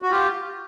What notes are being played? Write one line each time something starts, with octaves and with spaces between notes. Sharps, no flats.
F#4
F4 G4